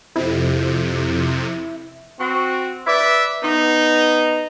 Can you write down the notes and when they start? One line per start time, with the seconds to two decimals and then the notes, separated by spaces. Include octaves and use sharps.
0.16 F2 C3 E4
2.19 C4 F#4
2.87 B4 D5 E5
3.42 B3 D#4